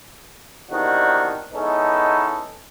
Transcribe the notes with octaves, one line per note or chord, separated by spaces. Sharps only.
E2 C3 D#3 D4 D#4 F#4
G#3 B3 C#4 D#4 E4 A4